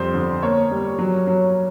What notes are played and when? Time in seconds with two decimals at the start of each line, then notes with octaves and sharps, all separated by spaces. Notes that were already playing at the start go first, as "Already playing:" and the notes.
Already playing: F2 G3 C5
0.14 D3
0.42 A#3 C#5
0.71 G3
0.99 F#3
1.27 F#3